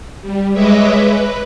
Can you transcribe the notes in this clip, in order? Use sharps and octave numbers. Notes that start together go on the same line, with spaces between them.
G3
G#3 B4 C#5 D#5 E5 D6
B4